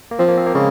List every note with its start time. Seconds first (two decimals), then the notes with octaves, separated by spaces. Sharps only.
0.11 A#3
0.19 F3 C4
0.28 A#3
0.37 C4
0.46 A#3
0.54 C#3 G#3